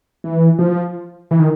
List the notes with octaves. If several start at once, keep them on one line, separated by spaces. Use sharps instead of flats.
E3
F3
E3
D#3